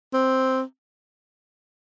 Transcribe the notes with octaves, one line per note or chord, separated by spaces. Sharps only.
C4